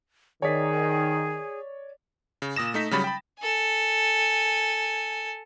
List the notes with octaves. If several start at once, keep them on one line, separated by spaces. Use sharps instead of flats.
D#3 G#4 C#5 D5 B6
C#3
A#2 D#6 A#6 E7
A3 D#4 B6
C#3 F#3 G3 C#4 B5 A6
G5 B5
A4 G#5